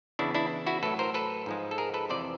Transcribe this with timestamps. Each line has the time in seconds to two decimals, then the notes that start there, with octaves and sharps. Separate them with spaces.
0.19 E2 C#3 E3 D4 E4
0.35 D4 E4
0.66 E4 F#4
0.83 A2 F#3 A4 B4
0.99 A#4 C5
1.14 A4 B4
1.46 G#2 F3 G#3
1.71 A4
1.78 G#4 A#4
1.94 A4 B4
2.09 F2 C3 E3 C5 D5